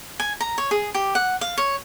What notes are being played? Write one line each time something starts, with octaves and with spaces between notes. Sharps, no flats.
G#5
A#5
C#5
G#4
G4
F#5
F5
C#5